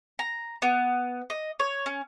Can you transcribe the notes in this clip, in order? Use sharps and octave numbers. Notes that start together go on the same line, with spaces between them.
A#5
B3
D#5
C#5
C#4